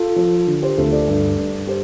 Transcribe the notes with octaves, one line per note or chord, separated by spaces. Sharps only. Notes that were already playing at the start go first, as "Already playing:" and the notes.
Already playing: F4 A4
F3
D3
G4 C5
D2 F4 A4
A4 D5
G2
G2
G4 C5